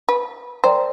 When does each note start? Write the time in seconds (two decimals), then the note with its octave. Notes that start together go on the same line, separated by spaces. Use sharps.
0.09 B4
0.64 A#4 C5 D5 G5 A#5